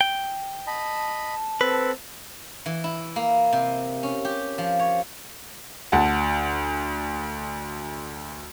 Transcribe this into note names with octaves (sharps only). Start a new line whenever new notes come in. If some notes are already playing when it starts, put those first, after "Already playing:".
G5
D#5 A5 B5
C4 A4 B4
E3
E4
A#3
C3
C#4
G4
F3
C#5
D2 F#5 A5